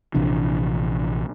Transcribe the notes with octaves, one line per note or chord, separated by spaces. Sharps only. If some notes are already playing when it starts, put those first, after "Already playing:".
A#1 C3 E3 D4